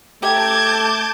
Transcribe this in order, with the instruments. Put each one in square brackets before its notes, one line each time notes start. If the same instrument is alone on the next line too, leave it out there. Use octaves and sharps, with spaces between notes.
[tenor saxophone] A3 [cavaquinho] G4 A#5 [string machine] A5 D6 G6 [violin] G#6